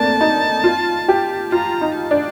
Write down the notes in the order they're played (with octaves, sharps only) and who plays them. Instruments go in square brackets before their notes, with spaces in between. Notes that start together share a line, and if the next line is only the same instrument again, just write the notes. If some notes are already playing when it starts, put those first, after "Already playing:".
Already playing: [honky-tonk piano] A3 A#3 C4 D4 [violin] A5
[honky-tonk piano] D#4
F4
G4
[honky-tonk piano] F4 [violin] A#5
[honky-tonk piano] D#4
[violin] A5
[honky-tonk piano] D4